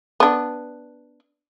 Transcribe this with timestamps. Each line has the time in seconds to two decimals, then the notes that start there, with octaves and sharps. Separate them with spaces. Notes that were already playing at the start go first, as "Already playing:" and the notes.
0.20 B3 D4